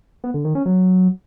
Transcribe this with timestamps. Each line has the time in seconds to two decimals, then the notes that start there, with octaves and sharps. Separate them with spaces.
0.24 B3
0.34 D3
0.45 D#3
0.55 C#4
0.66 F#3